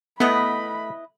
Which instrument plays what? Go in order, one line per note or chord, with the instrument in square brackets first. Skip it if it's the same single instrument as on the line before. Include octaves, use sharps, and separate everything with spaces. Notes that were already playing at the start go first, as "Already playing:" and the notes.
[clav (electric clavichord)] A3 [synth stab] B3 [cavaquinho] E4 B4 D#5 [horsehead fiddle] B5